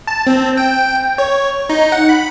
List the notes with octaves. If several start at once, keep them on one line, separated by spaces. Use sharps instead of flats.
A5
C4
G5
C#5
D#4
F#5
B5